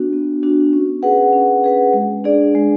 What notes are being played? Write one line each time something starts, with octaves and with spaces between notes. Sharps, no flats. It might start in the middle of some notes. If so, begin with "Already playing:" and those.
Already playing: B3 D4 F#4
B3
D4 F#4
C#4
G#4 B4 F#5
C#4
G#4 B4 F#5
G#3
D4 G#4 D5
G#3